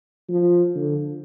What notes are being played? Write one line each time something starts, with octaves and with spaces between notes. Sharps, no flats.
F3
D3